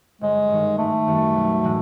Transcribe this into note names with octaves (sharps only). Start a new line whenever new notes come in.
G1 G#3
G2 D#3
G#1 A3
F#2 D#3 G3
B1
A2 E3 G#3